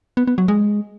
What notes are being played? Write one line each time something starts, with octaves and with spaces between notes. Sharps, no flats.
B3
B3
F#3
G#3